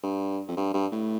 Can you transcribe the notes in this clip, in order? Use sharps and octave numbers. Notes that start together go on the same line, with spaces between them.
G2
F2
G2
G2
A2